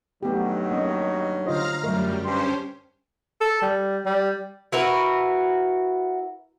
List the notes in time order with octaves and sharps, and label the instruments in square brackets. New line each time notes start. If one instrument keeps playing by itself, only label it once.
[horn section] G2 D#3 F#3 [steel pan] A3 B3 G4
[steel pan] A#3 C#4 [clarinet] D#5
[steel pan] D3 F4 C5 [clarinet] D#5 [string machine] F5 A#5 F6
[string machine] F#2 G3 [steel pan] F#3 A#4 [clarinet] A3
[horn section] G2 [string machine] C#4 G4 C5 [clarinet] C6
[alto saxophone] A4
G3
G3
[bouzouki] E4 F#4 A#4 B4